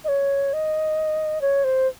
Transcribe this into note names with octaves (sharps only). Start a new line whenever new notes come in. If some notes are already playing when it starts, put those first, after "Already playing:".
D#5
C#5
D#5
C#5
C5